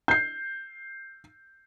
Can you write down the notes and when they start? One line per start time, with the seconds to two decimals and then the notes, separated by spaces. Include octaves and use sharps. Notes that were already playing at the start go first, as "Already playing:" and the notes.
0.08 G6 C7